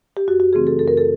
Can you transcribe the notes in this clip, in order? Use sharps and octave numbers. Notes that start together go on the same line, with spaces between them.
G4
F#2 F#4
F#4
C#3 E3 A3 C4 G#4
A4
F#2 A4
A#4
A4